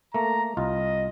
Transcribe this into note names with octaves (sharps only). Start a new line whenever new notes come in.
A3 A#3 A#5
C2 F4 D#5